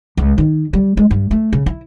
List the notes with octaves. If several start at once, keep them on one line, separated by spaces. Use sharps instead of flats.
C#2
D#3
G3
G#3
G2
A3
C#3
E4